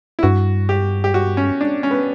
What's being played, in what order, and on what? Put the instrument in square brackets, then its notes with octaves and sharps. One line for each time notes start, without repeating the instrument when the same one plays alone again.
[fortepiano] E4
[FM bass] G2 [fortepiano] F#4
[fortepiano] G4
G4
F#4
C#4
D4
C#4
B3